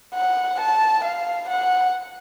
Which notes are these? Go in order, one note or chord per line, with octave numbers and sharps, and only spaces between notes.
F#5
A5
F5
F#5